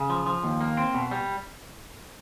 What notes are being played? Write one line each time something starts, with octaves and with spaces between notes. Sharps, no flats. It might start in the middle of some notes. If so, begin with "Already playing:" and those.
Already playing: C#3
F3
F3
D#2
A#3
C4
B2
G3